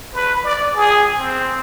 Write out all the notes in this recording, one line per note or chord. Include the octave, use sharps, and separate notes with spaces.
B4
D5
G#4
C4